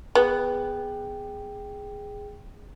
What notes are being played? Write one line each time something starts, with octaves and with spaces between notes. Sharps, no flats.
B3 G#4 G5